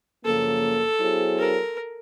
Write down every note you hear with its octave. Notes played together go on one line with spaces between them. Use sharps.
F#2 C#3 F3 A#3 A4
F#3 B3 E4 G#4 C5
A#4